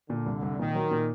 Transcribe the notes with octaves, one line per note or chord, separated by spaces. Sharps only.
A#2 D3
C2
C2
A#2 D#3
F#3
A#2